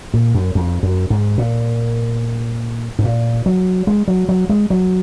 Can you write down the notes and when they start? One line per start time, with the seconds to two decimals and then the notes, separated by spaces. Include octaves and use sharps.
0.14 A#2
0.35 F#2
0.55 F2
0.83 F#2
1.10 G#2
1.38 A#2
2.99 G#2
3.04 A#2
3.46 F#3
3.87 G#3
4.08 F#3
4.29 F#3
4.49 G#3
4.70 F#3